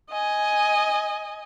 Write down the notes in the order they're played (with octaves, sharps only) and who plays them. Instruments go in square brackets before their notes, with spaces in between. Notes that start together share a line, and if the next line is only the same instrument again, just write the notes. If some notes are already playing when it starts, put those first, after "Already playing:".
[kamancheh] D#5 G#5